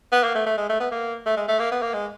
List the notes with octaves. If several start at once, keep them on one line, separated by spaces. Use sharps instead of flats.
B3
A#3
A3
A3
G#3
A3
B3
A#3
A3
G#3
A3
A#3
B3
A#3
G#3